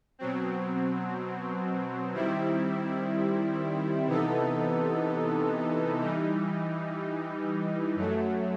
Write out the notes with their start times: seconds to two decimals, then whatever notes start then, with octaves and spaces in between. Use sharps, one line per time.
0.19 B2 F#3 C4
2.13 D#3 G3 C4 E4
4.07 C3 E3 B3 D#4 A4
6.01 E3 G3 D#4
7.95 F#2 F#3 A3